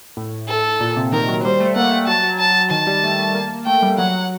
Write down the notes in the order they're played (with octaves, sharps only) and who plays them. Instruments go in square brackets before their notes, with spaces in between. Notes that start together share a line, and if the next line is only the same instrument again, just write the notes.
[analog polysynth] A2
[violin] A4
[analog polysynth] A#2
C3
[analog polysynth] D#3 [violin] A#4
[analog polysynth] F#3
[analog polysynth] G3 [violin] C5
[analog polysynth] A3
[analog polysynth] A#3 [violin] F#5
[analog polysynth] A3
[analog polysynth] F#3 [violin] A5
[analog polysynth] F#3
[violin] A5
[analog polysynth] D#3 [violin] A5
[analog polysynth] G3
A3
A3
A#3
[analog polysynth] A3 [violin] G5
[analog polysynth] G3
[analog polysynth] F#3 [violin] F#5